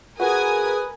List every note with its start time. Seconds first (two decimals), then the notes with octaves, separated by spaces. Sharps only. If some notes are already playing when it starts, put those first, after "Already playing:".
0.20 F#4 G#4 A#4 B4 G#5 D#6